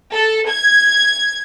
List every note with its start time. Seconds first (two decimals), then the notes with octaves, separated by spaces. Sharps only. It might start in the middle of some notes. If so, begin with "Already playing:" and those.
0.13 A4
0.49 G#6